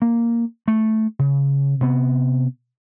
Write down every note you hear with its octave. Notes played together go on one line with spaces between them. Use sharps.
A#3
A3
C#3
C3 B3